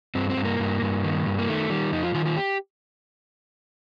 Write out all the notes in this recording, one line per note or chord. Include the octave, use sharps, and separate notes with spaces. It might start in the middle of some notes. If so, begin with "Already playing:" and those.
G2 C4
C4
G2
A#3
G2
G2
D#3
G2
A#3
D#3 A3
D#3 G3
F2 D#4
F4
D#3 F4
F4
G4